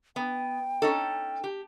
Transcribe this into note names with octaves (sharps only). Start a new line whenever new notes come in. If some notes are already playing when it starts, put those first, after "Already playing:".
B3 G5
C#4 D#4 A4
G4